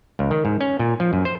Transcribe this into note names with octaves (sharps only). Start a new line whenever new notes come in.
C#2
D#3
G#2
C#4
A#2
F3
F#2
C5